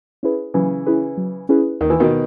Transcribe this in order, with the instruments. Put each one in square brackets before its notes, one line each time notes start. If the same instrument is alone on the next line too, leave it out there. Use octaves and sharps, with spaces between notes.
[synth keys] C#4 E4 G#4 B4
[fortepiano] C#3 E3 [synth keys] F#3
[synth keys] C#4 E4 G#4 B4
F#3
C#4 E4 G#4 B4
[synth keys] D#2 [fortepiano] D#3
[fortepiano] E3
B2 D#3